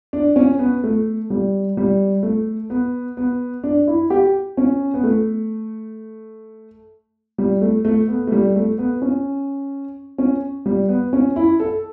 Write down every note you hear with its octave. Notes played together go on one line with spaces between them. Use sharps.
D4
C#4
B3
A3
G3
G3
A3
B3
B3
D4
E4
G4
C#4
B3
A3
G3
A3
A3
B3
A3
G3
A3
B3
C#4
C#4
G3
B3
C#4
E4
A4